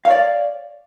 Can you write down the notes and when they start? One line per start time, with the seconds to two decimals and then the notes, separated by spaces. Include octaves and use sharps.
0.05 F5
0.08 C#5
0.10 D5